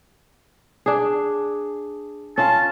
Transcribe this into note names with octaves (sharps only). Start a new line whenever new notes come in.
D4 G#4
C#4 F4 A5